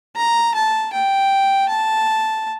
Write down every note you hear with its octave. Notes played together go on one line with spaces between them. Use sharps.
A#5
A5
G5
A5